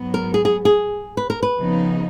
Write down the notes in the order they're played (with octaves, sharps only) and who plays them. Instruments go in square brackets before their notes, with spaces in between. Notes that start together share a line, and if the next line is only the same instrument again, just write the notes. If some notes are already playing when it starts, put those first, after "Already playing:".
Already playing: [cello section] G#2 F#3 B3
[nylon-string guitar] A#4
G#4
G#4
G#4
B4
A#4
B4
[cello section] F2 C#3 F3 B3 D#4